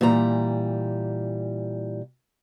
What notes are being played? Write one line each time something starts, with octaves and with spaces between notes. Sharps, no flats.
A#2 E3 G3 A#5